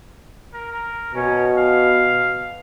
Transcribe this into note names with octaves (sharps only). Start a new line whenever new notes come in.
A#4
B2 C#4
F5